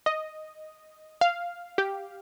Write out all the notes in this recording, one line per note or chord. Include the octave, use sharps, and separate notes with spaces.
D#5
F5
G4